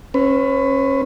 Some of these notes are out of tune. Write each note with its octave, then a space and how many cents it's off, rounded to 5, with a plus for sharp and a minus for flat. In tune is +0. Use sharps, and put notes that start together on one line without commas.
C#4 -25 B4 +25